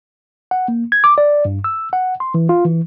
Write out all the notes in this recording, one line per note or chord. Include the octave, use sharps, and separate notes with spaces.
F#5
A#3
G#6
D6
D5
G2
E6
F#5
C6
E3
F4
E3